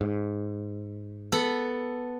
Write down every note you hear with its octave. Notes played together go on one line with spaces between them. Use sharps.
G#2
B3 A4 B5